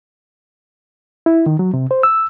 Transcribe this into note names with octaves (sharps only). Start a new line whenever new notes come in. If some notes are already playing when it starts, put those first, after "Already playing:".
E4
D#3
F#3
C3
C5
E6